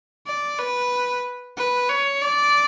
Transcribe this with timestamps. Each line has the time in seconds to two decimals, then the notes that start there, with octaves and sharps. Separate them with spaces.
0.27 D5
0.59 B4
1.57 B4
1.89 C#5
2.22 D5